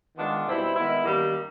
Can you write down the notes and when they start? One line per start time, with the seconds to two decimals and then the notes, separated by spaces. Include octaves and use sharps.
0.17 D#3 G#3 B3 D4 F4
0.46 B2 G3 C4 E4
0.75 D#3 G#3 B3 E4
1.05 F#2 D#3 G3 A#3 D#4